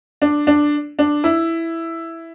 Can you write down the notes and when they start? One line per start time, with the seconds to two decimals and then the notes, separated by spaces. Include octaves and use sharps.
0.22 D4
0.47 D4
0.99 D4
1.24 E4